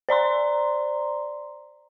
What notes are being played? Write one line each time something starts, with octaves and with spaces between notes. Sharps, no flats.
C5 D5 A#5 C6